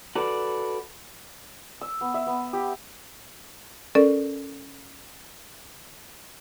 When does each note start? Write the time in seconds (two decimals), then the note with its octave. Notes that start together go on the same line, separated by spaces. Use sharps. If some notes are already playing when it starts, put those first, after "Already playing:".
0.15 F#4 A4 B4 D5
1.81 E6
2.01 B3
2.14 E5
2.27 B3
2.53 G4
3.95 C#4 A4 A#4 D5